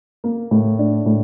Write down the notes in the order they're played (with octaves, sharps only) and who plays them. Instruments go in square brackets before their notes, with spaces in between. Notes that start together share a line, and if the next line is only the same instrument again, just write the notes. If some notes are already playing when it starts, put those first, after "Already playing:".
[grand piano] A#3
A2
D4
A2